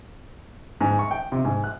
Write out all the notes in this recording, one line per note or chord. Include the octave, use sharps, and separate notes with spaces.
G#2
C#6
G5
C3
G#2
F#6